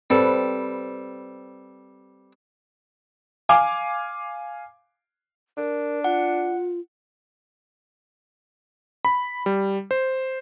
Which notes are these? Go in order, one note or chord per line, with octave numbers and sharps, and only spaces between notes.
G3 C4 A4 B4
F5 G#5 D6
D4 A#4
F4 F#5
B5
G3
C5